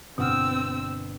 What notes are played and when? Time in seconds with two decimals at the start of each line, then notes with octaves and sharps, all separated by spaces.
0.18 G1 B2 C4 F#5 E6 F6